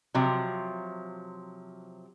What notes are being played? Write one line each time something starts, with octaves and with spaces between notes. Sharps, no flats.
C3 F3 F#3